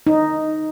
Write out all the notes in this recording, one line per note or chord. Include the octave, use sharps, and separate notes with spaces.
D#4